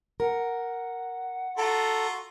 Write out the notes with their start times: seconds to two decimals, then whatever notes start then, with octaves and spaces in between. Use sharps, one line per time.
0.20 A#4 F#5
1.58 F4 F#4 A4 A#5